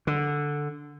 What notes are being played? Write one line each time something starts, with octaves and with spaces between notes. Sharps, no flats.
D3